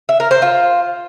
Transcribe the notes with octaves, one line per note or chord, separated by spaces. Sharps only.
E5
A#4
C5
F4